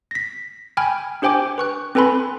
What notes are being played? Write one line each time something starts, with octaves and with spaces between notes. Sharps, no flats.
A#6 B6
G5 G#5 B5 F6 G#6
D4 G4 C5 G5 G#5 D6
B4 C#6 F#6
C4 A4 B4 G#5 B5 C6